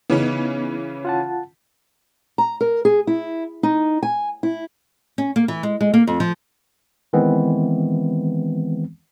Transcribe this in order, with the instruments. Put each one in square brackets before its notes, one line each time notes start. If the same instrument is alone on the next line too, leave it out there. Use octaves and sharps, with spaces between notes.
[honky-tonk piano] C#3 E3 C#4 [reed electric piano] B3 D#4
[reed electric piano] F4 F#5 A5
[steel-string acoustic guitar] A#5
A#4
G#4
E4
D#4
G#5
E4
[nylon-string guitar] C#4
A#3
E3
G#3
G#3
A#3
F2
F3
[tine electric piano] D#3 E3 G#3 B3 C4